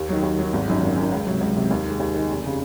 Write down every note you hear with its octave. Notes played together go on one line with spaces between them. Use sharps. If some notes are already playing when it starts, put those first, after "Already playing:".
Already playing: D#2
D#3 F#3
D#2
D#3 F#3
G#1
F#2 D#3
G#1
F#2 D#3
C#2
C3 F#3
C#2
C3 F#3
D#2
D#3 G#3
D#2
D#3 G#3
F1
C#3